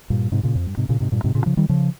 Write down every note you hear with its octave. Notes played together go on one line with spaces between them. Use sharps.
G2 A#2
G#2 C3
A#2 C#3
F2
G2
G#2 C3
A#2 C#3
G#2 C3
G2 A#2
G#2 C3
A#2 C#3
C#3 F3
D#3 G3
C#3 F3